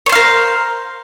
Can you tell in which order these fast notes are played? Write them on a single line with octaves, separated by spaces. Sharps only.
C#5 C5 F5 A#4